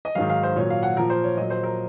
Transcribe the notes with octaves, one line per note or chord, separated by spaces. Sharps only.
D#5
G#2 D#3 F#3 F5
F5
C5
A#2 F#3 C#5
F5
F#5
A#2 F3 A#4
C5
C#5
A#2 F#3 D#5
C5
A#4